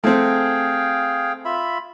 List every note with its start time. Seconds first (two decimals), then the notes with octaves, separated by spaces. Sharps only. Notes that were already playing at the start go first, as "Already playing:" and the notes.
0.04 A3 C4 G#4 F5 G5
1.45 F4 E5 B5